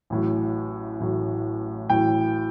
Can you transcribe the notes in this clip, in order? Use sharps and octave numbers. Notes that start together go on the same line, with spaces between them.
A1 A2 F#3
A1 A2 F#3
A1 A2 F#3 G5